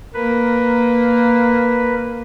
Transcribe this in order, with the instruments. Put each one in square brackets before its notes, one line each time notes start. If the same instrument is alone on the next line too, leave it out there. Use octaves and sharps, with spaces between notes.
[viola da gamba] A#3 [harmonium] A#4 [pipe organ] B4